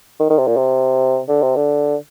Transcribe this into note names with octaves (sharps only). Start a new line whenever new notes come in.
D#3
D#3
C3
A#2
C3
D3
C3
D3